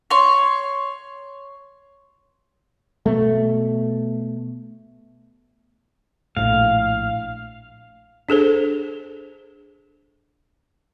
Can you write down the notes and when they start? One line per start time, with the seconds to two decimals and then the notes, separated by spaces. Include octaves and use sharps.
0.10 C#5 C6
3.06 B2 A3
6.37 A#1 A2 F5
8.29 D4 G#4 A4 C5